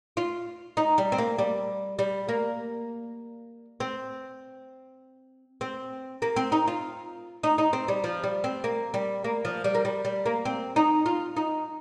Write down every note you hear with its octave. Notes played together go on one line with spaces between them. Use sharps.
F4
D#4
G3
C4
A#3
G3
G3
A#3
C4
C4
A#3
C4
D#4
F4
D#4
D#4
C4
G3
F3
G3
C4
A#3
G3
A#3
F3
G3
A#3
G3
G3
A#3
C4
D#4
F4
D#4